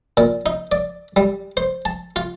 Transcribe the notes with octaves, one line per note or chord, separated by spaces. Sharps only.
A#2
D#4
D5
G3
C5
A5
F4